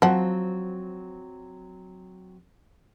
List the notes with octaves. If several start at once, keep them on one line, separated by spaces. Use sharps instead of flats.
F3 F#3 C4 F#5